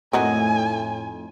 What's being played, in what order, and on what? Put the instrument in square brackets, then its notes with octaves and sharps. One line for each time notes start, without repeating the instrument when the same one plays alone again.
[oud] F2 A3 D#4 [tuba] A2 [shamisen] C4 F#4 A#4 [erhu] G#5